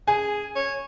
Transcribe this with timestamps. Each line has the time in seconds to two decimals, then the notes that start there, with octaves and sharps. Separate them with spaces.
0.08 G#4 G#5
0.56 C#5